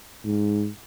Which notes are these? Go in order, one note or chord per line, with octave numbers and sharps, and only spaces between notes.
G#2